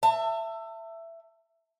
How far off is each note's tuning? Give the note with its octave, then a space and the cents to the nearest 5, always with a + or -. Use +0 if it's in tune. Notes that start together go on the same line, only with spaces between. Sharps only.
E5 +10 A5 +35